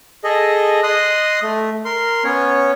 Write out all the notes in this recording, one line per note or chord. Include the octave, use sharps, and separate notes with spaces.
G#4 A4 D#5
D#5 C6 D#6 F#6
A3
A#4 C6
B3 C#4 C#5